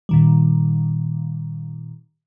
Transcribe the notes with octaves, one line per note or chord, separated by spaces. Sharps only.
A#2 D#3 G3